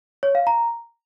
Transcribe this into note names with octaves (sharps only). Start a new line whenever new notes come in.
C#5
F5
A#5